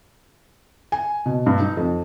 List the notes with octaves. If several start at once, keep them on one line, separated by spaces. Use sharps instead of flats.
G#5
B2
G2
D#4
F2